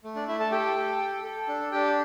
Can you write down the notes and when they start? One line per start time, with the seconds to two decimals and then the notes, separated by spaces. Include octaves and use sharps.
0.04 A3
0.15 D4 D5
0.27 A3 E4 E5
0.40 A4 A5
0.51 G4 A4 G5
0.76 A4
1.00 A4
1.24 A4
1.48 D4
1.72 D4 G4 G5